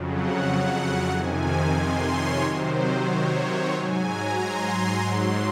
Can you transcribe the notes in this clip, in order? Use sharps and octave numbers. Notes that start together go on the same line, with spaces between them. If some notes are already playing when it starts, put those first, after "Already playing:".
Already playing: F2 C#3 F#3
F#5
F#5
F2 C3 D#3 G#5
C6
C#5
C3 D#3 F#3 C5
C#5
C#5
G#2 F#3 G#5
A#5
C6
G#2 F#3 C6